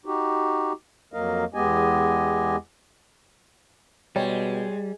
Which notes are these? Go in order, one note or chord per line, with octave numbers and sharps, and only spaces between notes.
D#4 F#4 G4
F2 F#3 A#3 A#4 D#5 F5
E2 G#3 B3 G4 D#5 G#5
B2 G3 G#3 C#5 G5